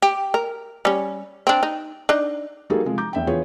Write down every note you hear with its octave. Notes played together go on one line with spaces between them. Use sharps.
G4
A#4
G3 C#4
C4 D4
D#4
D4 D#4
G3 A#3 D#4 F#4 G#4 A4
C3 F3 G#3
A#5 D6 G6
E2 E5 G5
E3 B3 F4 G#4 B4 C#5